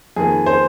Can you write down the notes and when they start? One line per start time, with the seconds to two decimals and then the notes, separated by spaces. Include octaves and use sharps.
0.16 F2 D#3 A#3 G#4
0.46 C5